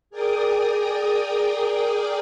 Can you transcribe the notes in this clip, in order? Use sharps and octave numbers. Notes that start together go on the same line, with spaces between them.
G#4 A#4 D5 G5 D6 D#6